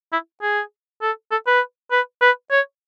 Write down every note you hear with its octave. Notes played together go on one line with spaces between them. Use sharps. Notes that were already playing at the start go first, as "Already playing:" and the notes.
E4
G#4
A4
A4
B4
B4
B4
C#5